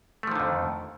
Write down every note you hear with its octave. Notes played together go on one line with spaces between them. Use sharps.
F2 D3 D#3 F3 A3